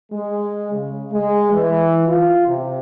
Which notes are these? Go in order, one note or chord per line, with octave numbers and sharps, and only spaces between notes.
G#3
C#3
G#3
E3
F4
C3